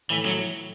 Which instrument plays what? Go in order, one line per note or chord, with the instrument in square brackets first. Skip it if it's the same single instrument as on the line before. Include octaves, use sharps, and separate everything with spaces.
[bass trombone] A2 [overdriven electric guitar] E3
[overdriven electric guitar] F#3